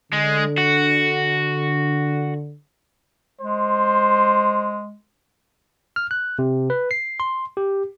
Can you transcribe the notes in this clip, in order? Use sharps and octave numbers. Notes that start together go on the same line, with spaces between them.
D3 G#3
F#4
G#3 C5
F6
F#6
C3
B4
C7
C6
G4